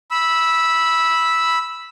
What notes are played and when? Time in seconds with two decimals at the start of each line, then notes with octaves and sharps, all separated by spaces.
0.11 B5 E6